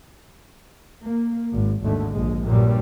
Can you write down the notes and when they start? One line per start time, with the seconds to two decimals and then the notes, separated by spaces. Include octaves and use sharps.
1.04 A#3
1.52 G#1
1.83 G#1 D#2 G#2 D3 A3
2.11 A#1 D#2 G#3
2.46 G2 A#2 F#3 G3